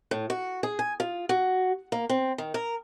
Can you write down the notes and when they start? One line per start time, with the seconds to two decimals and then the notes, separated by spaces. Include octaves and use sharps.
0.11 A2
0.30 F#4
0.63 G#4
0.79 G#5
1.00 F4
1.29 F#4
1.92 A#3
2.09 C4
2.38 D#3
2.54 A#4